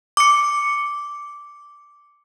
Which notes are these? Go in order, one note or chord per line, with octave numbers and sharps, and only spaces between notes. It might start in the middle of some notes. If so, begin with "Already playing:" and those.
D6 C#7